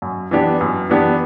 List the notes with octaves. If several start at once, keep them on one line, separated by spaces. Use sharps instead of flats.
F#2
E3 B3 D4 G4
F#2
E3 B3 D4 G4